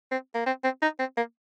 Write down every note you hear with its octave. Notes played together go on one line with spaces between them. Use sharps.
C4
A#3
C4
C4
D#4
C4
A#3